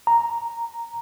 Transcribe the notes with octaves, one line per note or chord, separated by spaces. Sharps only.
A#5